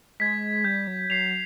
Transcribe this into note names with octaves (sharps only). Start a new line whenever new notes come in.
G#3 G#6 B6
G3 G6
F#3
F#3 C7 F7